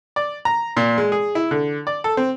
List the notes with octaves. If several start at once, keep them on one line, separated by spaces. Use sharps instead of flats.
D5
A#5
A#2
G#3
G#4
E4
D3
D5
A4
C4